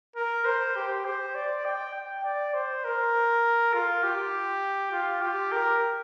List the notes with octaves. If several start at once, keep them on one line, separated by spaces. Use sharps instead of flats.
A#4
C5
G4
C5
D5
G5
G5
D5
C5
A#4
F4
G4
F4
G4
A#4